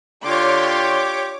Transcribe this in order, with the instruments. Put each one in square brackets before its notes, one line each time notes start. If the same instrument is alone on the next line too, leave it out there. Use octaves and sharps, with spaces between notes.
[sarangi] D3 [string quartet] F4 G5 C6 [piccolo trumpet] G4 [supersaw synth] C#5 D6